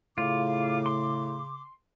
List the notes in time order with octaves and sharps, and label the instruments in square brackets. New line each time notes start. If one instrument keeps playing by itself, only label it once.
[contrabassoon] A2 [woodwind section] C#3 D6 [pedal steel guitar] F4
[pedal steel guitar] C6